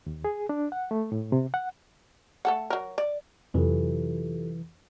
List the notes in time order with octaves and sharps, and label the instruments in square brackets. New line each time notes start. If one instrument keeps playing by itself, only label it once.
[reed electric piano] D#2
G#4
D4
F#5
A3
A2
C3
F#5
[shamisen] A3 A4 F#5
F#3 A#4
D5
[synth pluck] F2 [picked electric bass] C3 F#3 [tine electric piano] E3 [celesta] F4 G4 A4